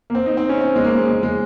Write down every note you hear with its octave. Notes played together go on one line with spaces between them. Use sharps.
A#3
C4
D#4
C4
C#4
C4
G#3
A#3
G#3
G#3